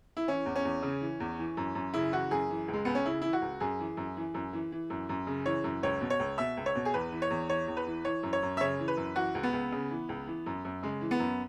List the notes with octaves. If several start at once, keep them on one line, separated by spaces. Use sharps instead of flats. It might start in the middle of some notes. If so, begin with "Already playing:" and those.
E4
E3 C#4
E2
C#4
E2
C#3
E3
E2
E3
F#2
F#2
C#3 E4
E3 F#4
F#2 G#4
E3
C#2
G#3
C#2 B3
C#4
C#3 E4
E3 E4
F#4
C#2
F#2 G#4
E3
F#2
E3
F#2
E3
E3
F#2
F#2
C#3
E3 C#5
F#2
C#2 C#5
B2
C#5
C#2
B2 E5
C#2
C#5
B2
G#4
E2 B4
E3
C#5
E2
E3 C#5
E2
B4
E3
E3 C#5
F#2
C#5
F#2
E5
C#3 C#5
E3
B4
F#2
E3 F#4
C#2
B3
C#2
C#3
E3
C#2
E3
F#2
F#2
C#3 G#3
E3
B3
F#2